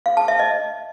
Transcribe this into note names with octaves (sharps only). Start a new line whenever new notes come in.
F5
A5
E5
D#5